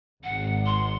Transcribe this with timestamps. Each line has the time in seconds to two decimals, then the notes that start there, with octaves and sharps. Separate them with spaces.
0.24 G#1 F#5
0.66 C6